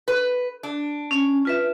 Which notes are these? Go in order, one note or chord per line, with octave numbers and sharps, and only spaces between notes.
B4
D4
C#4
F4 B4 E5